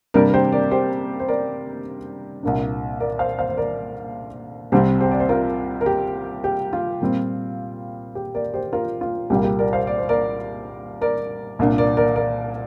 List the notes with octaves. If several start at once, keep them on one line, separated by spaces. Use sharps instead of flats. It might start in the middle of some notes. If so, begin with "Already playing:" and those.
C3 G3 A#3 D4 A#4 D5
A#4
G4 C5
A#4 D5
G4 C5
C5
A#4 D5
C2 A#2 A#3 D4
A#4 D5
C5 F5
C5 F5
C5
A#4 D5
C2 C3 G3 C4 G4 C5
G4 C5
D5
C5
F4 A#4
A#4
G4
G4
F4
A#2 G3 C4
G4
A#4 D5
G4 C5
F4 A#4
F4
C2 A#2 G3 A#3 G4
G4
A#4 D5
C5 F5
D5
C5
A#4 D5
A#4 D5
C2 A#2 A#3 D4
A#4 D5
A#4 D5
A#4 D5